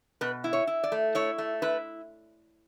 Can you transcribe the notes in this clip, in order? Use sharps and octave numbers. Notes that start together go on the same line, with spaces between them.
B2 B4
E4
C#5
E4
D5
A3
E4 C#5
A3
E4 B4